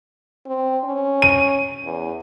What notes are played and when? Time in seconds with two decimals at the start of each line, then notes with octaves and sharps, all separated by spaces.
0.46 C4
0.84 C#4
1.22 D#7
1.85 E2